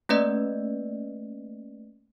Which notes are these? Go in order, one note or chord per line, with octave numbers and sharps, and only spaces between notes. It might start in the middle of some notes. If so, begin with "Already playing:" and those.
A3 A#3 C#4 B4 D5 D#5